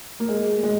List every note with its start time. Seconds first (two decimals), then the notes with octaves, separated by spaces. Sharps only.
0.20 A#3
0.28 G#3
0.63 G#3